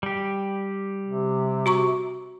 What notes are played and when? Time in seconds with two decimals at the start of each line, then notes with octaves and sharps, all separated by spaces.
0.03 G3 G4
1.06 C3
1.66 F#4 A#5 C#6